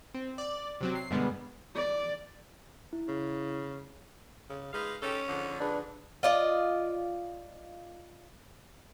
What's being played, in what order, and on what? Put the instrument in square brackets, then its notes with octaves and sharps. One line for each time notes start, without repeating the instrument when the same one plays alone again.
[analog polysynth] C4
D5
C3 F#3 C4
C7
F#2 B2 D3 G3 G#3 B3
[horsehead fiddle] D5
[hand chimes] E4
[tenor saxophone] C#3
C#3
[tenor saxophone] G#3 [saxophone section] D#4 B4 F5
[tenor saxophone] C#4 [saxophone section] D#4 G4 A4
[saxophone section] F2 G#2 D3
[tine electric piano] D4 B4 [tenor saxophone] G#4
[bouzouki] F4 D5 D#5